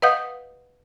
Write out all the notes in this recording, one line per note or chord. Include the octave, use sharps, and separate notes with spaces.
B4 D#5 F5 F#5 D#6 G6